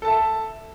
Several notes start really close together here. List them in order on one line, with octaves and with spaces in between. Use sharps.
A4 A5 E5